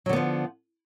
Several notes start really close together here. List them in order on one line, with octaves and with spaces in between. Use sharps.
F#3 D3 B3 F3